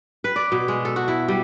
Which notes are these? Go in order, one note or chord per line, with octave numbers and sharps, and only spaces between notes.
B4
D5
B2
G#3
A4
F#4
E4
G3